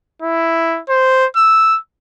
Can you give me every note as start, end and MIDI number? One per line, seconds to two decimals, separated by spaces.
0.23 0.80 64
0.89 1.26 72
1.37 1.78 88